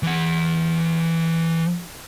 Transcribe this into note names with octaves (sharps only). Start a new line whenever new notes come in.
E3 F#5